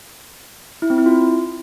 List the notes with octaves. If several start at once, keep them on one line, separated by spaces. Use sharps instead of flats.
E4
C4
E4
F4